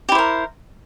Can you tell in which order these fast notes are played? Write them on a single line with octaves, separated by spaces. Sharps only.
G4 E4 C5 A#4